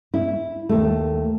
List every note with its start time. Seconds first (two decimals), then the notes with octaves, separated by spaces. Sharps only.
0.14 E4
0.69 D#2 A3